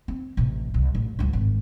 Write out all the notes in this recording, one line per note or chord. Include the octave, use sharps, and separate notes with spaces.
C4
A1 C3
C2
A1
C#2 G2
G#1